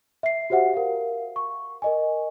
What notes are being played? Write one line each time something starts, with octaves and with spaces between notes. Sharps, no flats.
E5 C7
F#4 G4 C5 E5 F#5
A#4 F5
C#6
A#4 D#5 G#5